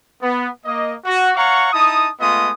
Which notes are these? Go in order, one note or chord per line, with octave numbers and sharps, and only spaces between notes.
B3
A#3 D#5
F#4
C#5 F5 F#5 A#5 C#6
D#4 E4 A5 D#6
G#3 A3 B3 F4 D#5 D#6